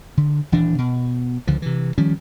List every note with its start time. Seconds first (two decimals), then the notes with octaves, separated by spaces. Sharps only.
0.17 D3
0.52 D#1 E3 D4
0.78 B2
1.47 C#2 D3 F3
1.62 C3 E3
1.98 D#3 F3 G3 C#4